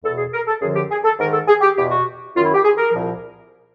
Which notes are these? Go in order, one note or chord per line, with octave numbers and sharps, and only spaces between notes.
E2 B2 A4
G#4
A#4
A4
F#2 D3 F3 G#4
G4
G#4
A4
G#2 D#3 A#4
A4
G#4
G4
E2 B2 G4
F#4
F#2 D#3 F4
E4
G4
G#4
A#4
C2 A#2 F3